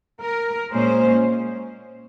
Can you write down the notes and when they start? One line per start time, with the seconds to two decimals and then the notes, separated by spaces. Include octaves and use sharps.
0.22 A#4
0.71 A#2 G#3 C#4 C5